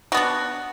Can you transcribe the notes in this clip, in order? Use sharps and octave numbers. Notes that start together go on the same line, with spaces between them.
B3 D4 F#4